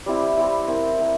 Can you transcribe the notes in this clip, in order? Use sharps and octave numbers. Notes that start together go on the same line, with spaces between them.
G3 C4 E4
G3 C4 E4
C4 E4 A#4
C4 E4 A#4